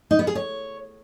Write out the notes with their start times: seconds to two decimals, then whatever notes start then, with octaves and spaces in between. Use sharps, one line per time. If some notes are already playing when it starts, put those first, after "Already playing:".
0.11 D#4
0.19 B3
0.27 G#4
0.35 C#5